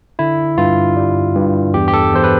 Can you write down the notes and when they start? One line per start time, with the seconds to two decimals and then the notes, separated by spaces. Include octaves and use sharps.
0.19 D3 E4
0.58 G2 F4
0.96 G3
1.35 G2
1.74 E2 G4
1.88 G4
1.94 A4
2.13 E2 C5
2.24 B4